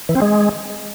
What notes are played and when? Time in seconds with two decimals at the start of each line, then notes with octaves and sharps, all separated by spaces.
0.09 E3
0.15 C4
0.22 G#3